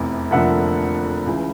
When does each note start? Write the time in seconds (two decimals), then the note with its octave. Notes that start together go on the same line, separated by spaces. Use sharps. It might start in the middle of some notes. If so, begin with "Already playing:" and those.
Already playing: F1 E2 C3 E3
0.31 F1 F2 D3 F3 A#3 E5 F#5
1.26 C#2 C#3 E3